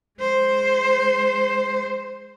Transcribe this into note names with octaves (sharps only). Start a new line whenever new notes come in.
G#3 C5